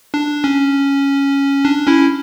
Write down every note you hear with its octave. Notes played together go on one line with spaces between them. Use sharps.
D4
C#4
D4
C#4 E4